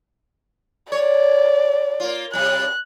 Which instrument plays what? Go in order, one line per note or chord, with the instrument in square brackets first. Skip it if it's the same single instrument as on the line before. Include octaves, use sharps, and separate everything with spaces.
[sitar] C#5 [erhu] D5
[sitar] A#3 F4
[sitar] C3 G3 [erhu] F#6